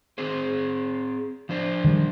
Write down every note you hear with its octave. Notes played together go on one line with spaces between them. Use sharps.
C4 G#4 C5
F3 D4 C5
D#3 G3